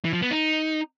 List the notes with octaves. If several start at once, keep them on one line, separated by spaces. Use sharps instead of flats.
E3
F3
B3
D#4